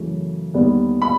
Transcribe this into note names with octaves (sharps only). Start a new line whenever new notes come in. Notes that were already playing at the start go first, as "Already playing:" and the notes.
Already playing: F#2 C#3 E3 A3
D#2 D3 G3 B3
B5